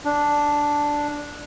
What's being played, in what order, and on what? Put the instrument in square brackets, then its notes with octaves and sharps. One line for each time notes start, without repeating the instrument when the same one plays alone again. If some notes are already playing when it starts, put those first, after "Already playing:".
[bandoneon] D4